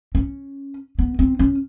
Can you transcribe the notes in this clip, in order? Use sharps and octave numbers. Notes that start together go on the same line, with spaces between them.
C#4
B3
C4
C#4